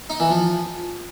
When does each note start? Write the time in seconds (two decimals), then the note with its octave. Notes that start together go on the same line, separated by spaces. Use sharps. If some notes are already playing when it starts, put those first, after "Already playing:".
0.10 D#4
0.20 E3
0.30 F3